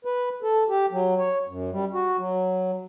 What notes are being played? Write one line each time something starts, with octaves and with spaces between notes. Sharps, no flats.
B4
A4
G4
F#3
C#5
F#2
G3
F#4
F#3